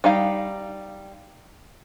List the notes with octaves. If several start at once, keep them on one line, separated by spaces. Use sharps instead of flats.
G3 D#4 F5